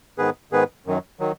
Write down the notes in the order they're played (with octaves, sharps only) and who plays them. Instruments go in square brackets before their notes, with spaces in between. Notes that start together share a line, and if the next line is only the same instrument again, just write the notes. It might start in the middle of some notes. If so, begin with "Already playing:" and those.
[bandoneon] G#2 D#3 B3 G#4 B4
G#2 D#3 B3 G#4 B4
F#2 D#3 F#3
D#3 F#3